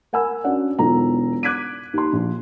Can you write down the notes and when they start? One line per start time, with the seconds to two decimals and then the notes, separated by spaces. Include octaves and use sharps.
0.13 A#4 F#5 G#5 B5 E6
0.44 C#4 D4 F#4 C#5 D5 F#5
0.79 E1 B1 F4 A4 A#5
1.43 D6 F#6 G#6 B6 D7 D#7
1.94 D#2 C6
2.13 A#1